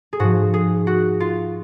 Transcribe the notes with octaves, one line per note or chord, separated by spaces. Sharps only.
G#4
G#2 F3 F#4
G#4
F#4
F4